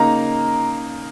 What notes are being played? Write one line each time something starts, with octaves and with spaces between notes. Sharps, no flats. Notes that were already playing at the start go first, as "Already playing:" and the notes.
Already playing: C#3 A#3 D#4 A#5